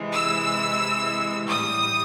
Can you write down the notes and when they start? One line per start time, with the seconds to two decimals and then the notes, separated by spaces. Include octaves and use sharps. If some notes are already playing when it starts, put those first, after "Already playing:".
Already playing: C3 E3 G#3
0.14 E6
1.48 A2 E3 G3 D#6